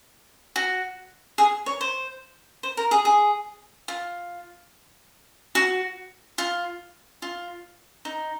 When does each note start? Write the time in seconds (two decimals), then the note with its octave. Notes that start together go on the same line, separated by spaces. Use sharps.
0.56 F#4
1.38 G#4
1.66 C#5
1.81 C5
2.63 C5
2.77 A#4
2.91 G#4
3.05 G#4
3.88 F4
5.55 F#4
6.38 F4
7.22 F4
8.05 D#4